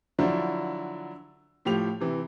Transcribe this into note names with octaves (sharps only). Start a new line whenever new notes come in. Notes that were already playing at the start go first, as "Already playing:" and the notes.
D3 F3 F#3 D4 E4
A2 F3 G4 F7
C3 E3